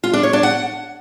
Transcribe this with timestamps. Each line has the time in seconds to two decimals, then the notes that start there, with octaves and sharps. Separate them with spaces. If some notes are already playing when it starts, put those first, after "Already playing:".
0.04 F4
0.13 D4
0.23 C#5
0.33 D4
0.43 F#5